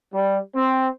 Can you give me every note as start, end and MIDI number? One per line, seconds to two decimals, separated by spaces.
0.14 0.39 55
0.55 0.88 60